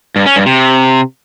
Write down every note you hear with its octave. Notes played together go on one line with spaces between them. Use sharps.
G2
C#4
G2
C3